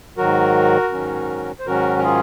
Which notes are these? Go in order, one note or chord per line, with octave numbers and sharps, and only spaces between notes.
G#2 D#3 F#3 F#4 A#4
G#2 D#3 F#3 C#4
C5
G#2 D#3 F#3 C#4 F#4 A#4
A#4
F4 G#4